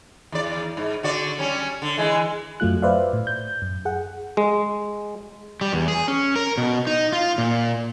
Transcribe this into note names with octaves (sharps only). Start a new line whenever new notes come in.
E2 D5
G#2
D3 F#4 D5
G3 C#4
D3
E3 G#3
F#2 F#3 A3 F4 F#6
B4 C5 D5 E5 F5
A2
G6
F#2
G#4 F#5
G#3
G3
E2
G#4
C#4
A#4
B2
D#4
F4
A#2